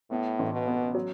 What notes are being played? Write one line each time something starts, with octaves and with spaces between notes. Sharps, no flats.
A2 B3
A1
B2
B3
F#3